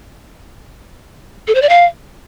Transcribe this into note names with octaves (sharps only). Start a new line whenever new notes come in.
A4
C5
D5
F5